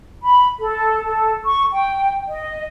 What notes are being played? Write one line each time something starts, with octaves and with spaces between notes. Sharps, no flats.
B5
A4
A4
C#6
G5
D#5